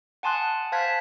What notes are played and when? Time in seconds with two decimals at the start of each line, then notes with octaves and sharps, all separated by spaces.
0.23 F#5 G#5 A5 C6 D#6 F#6
0.72 C5 F5 A5 F#6 G#6 B6